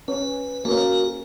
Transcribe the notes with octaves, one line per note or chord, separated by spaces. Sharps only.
C#4 B4
A#3 C#4 F#4 A#4